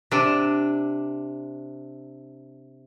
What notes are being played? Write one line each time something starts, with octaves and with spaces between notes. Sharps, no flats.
C3 D4